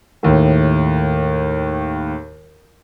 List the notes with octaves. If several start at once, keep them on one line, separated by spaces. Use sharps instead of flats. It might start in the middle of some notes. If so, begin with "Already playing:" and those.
D#2 A2